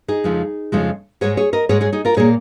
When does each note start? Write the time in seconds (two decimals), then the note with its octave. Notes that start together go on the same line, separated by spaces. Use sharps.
0.08 D#4 G#4
0.24 F2 C#3 F3 G#3
0.72 F2 C#3 F3 G#3
1.21 G#2 G#3 G#4 C#5
1.37 G#4 C#5
1.53 A#4 D#5
1.69 G#2 G#3 G#4 C#5
1.81 G#4 C#5
1.92 D#4 G#4
2.05 F4 A#4
2.17 A#2 A#3 G#4 C#5